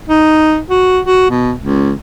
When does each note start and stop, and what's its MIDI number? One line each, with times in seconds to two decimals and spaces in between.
0.08 0.59 63
0.70 0.99 66
1.05 1.29 66
1.30 1.52 47
1.59 1.92 37